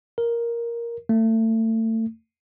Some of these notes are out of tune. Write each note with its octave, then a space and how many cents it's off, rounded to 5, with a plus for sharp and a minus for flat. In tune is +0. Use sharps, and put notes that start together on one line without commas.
A#4 +5
A3 +30